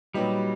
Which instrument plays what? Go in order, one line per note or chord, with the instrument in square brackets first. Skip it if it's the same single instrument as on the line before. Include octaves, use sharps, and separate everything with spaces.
[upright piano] A#2 F#3 B3 D#4 G4 [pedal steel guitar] G3